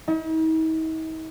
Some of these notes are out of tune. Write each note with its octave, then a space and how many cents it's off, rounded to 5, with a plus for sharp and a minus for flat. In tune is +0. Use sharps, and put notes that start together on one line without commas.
D#4 +45